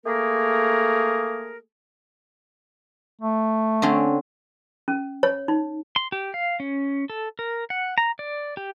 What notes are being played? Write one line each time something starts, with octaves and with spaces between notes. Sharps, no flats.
A3 A#3 G#4 A#4
A3
D3 C4 C#4
C#4
C#5
D#4
C6
G4
F5
C#4
A4
A#4
F#5
A#5
D5
G4